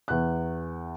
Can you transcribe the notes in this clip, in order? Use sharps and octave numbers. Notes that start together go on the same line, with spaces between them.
E2 F#6